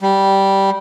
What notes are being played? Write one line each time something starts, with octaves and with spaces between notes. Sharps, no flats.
G3